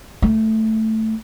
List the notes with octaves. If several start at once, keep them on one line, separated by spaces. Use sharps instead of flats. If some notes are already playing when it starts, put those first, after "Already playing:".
A3